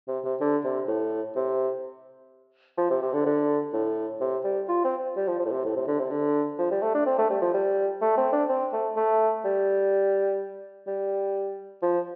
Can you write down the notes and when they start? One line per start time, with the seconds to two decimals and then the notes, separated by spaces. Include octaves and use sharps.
0.08 C3
0.25 C3
0.41 D3
0.64 C3
0.88 A2
1.36 C3
2.78 F3
2.91 C3
3.02 C3
3.13 D3
3.26 D3
3.73 A2
4.21 C3
4.44 G3
4.69 F4
4.85 C4
5.16 G3
5.28 F3
5.39 F3
5.45 A2
5.52 C3
5.65 A2
5.76 C3
5.88 D3
5.99 C3
6.11 D3
6.59 F3
6.71 G3
6.82 A3
6.94 D4
7.06 C4
7.18 A3
7.30 G3
7.42 F3
7.54 G3
8.02 A3
8.18 C4
8.33 D4
8.49 C4
8.73 A3
8.97 A3
9.45 G3
10.87 G3
11.82 F3